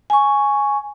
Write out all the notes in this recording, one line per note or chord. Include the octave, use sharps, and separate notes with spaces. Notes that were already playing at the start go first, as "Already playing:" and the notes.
G#5 C#6